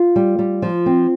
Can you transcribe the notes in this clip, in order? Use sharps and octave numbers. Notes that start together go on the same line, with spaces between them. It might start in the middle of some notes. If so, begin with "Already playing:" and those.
Already playing: F4
G3
G3
F3
C4